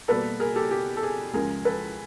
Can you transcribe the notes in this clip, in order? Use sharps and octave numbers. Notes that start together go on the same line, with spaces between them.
B2 G3 A#3 A4 B4
G#4 A#4
G4 A4
G4
A4
G#4
C#2 C#3 F3 G#3 G#4 A#4
A4 B4